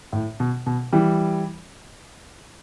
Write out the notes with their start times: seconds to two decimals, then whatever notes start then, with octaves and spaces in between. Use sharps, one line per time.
0.13 A2
0.40 B2
0.66 B2
0.93 E3 G3